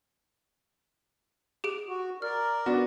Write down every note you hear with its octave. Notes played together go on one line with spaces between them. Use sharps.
G4 G#4 D7
F#4
A#4 D5 F6
B3 D4 F#4